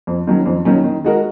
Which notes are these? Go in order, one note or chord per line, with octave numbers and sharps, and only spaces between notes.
F2
D#3 F#3 C#4
F2
D#3 F#3 C#4
D#3
G#3 D#4 F#4 A#4